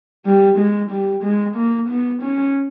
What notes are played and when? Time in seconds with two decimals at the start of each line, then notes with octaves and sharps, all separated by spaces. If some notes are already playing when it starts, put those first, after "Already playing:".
0.25 G3
0.58 G#3
0.91 G3
1.23 G#3
1.56 A#3
1.89 B3
2.22 C#4